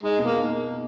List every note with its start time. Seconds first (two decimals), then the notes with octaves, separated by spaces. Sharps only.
0.03 G#3 D#4
0.19 B2
0.24 A#3
0.35 D#4